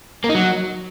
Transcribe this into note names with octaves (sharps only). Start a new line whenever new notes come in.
A#3
D#4
F#3